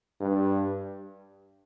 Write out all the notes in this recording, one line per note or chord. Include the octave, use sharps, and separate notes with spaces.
G2